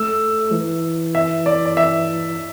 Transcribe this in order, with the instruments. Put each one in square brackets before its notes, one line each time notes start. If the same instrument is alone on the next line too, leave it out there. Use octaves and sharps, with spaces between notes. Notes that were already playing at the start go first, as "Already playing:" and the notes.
Already playing: [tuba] A3 [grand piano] E6
[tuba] E3
[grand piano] E5
D5
D5
E5